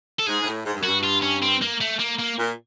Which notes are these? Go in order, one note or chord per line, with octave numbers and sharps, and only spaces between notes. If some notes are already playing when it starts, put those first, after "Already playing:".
A4
G#2 G#4
G#2
A2
G#2
G2
F#2
G2 F#4
F4
C#4
C4
A#3
A3
A#3
A#3
A#2